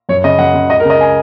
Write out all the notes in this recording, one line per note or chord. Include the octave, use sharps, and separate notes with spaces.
F#2 C#5
C#3 D#5
F#2 F#5
C#3
C#2 D#5
A#4
C#3 D#5
G#5